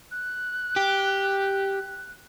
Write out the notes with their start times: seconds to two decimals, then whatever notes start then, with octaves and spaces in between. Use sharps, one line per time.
0.11 F#6
0.76 G4